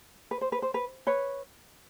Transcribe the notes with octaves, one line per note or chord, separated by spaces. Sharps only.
B4
C5
B4
C5
B4
B4 C#5